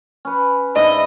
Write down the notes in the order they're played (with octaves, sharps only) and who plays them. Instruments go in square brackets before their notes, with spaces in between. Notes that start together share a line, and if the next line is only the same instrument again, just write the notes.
[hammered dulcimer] C#4 B4
[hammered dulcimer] G#2 D3 E4 [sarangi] D#5